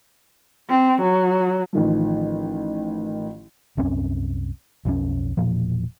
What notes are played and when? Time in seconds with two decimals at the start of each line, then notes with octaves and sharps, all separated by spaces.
0.70 C4
1.01 F#3
1.73 A1 D#3 F3
3.77 C2 F#2 C4 C#4
4.85 B1 F2 E3 C#4
5.37 E1 A#2 F3